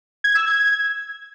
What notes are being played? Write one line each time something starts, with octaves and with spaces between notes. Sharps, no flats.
G#6
E6
G#6